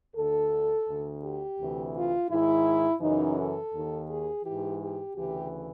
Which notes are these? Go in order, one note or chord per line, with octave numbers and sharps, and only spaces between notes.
D2 D3 A4
D2 D3
G4
D2 C3 E3
F4
G#2 D#3 E4
F#2 C#3 E3 D#4
A4
D#2 D#3
G#4
G#2 E3 G4
G4
D2 C#3 E3 G4